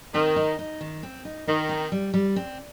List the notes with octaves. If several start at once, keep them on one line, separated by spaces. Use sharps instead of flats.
D#3 C4
D#4
D#4
D#3
C4
D#4
D#3 D#4
C4
G3
G3
C4